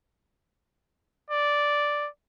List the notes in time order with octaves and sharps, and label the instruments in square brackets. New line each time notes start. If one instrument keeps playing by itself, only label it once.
[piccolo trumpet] D5